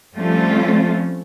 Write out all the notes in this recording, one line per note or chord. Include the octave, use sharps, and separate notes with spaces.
F3 G3 A3 C4 C#4 F4